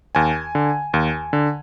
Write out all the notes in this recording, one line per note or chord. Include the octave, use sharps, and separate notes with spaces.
D#2 G#5
D3
D#2
D3